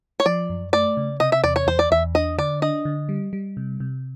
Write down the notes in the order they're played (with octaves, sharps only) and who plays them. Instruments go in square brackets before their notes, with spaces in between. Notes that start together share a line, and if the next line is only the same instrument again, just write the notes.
[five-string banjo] C#5
[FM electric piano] F3 [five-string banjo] D5
[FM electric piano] F#2
[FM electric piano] A3 [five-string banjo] D5
[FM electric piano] C#3
[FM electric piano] C3 [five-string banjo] D#5
[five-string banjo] E5
[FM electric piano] E2 [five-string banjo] D5
[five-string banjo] C#5
[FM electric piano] E2 [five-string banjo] C5
[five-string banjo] D5
[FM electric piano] E2 [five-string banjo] E5
[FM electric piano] D4 [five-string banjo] D#5
[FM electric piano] D3 [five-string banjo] D5
[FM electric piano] D4 [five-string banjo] D#5
[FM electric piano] D3
G3
G3
C3
C3